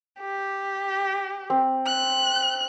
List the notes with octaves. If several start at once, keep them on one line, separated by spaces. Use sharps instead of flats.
G4
C4
F#6